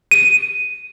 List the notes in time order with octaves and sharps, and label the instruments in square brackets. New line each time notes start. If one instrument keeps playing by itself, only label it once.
[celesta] D#7